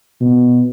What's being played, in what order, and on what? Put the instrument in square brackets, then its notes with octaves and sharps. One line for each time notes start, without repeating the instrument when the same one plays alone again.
[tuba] B2